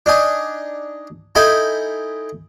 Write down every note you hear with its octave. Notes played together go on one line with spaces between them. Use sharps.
D4 D#4 G#5
D#4 E4 A4 G5 G#5 B5